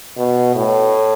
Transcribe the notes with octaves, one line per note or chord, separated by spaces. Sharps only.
B2
A2